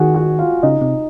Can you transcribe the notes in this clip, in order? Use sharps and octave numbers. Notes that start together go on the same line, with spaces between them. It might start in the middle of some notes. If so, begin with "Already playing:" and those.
Already playing: D#3 F#4 G#4 F#5 G#5
F#4 F#5
F4 F5
C#3 D#4 D#5
C3